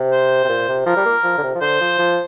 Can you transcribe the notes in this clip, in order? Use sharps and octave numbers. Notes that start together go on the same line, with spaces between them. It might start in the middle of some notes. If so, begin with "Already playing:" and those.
Already playing: C3
C5
C3
A#2
C3
F3 A#4
G3
A#3
F3
D3
C3
F3
D3 C5
F3
F3